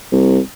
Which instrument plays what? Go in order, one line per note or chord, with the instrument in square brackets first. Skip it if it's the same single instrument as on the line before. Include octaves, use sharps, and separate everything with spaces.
[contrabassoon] C2